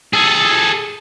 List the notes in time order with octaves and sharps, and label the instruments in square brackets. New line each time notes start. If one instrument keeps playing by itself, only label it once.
[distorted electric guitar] G#4 A4